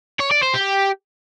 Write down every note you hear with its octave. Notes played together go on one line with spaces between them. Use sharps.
C#5
D5
C5
G4